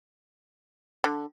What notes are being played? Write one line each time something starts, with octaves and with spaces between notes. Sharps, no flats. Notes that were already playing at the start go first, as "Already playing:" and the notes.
D3